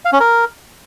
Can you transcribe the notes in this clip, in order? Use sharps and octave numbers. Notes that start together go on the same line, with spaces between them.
F5
C#4
A#4